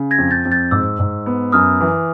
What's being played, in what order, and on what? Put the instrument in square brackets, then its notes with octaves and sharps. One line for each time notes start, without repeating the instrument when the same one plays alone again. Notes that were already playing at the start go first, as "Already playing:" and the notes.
Already playing: [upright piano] C#3
[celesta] G#6 A#6
[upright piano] F2
[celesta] G6 A6
[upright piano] F2
[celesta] G6 A6
[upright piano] G#2 [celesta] D6 E6
[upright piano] G#2
B3
[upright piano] F#2 [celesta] D#6 F6
[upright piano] E3